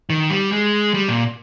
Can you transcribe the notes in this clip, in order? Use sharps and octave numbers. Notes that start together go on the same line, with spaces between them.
D#3
G3
G#3
G3
A#2